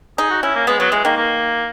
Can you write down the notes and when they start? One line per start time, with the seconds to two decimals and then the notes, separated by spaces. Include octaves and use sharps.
0.18 D#4 G#4
0.30 F#4
0.43 C#4 E4
0.55 A#3
0.67 G#3 B3
0.80 F#3 B3
0.92 E3 G#3
1.04 D#3 A#3
1.17 A#3